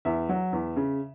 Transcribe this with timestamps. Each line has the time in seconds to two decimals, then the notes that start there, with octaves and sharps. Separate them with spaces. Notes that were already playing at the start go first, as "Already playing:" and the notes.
0.05 E2 E5
0.29 F#3
0.53 E2
0.76 C#3